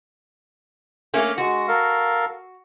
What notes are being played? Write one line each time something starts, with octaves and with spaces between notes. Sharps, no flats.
A3 A#3 C#4
G#3 F#4
A4 A#4 F5